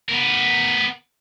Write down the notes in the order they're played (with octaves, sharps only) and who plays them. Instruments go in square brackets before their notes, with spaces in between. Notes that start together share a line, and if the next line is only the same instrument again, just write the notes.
[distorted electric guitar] B3 A#4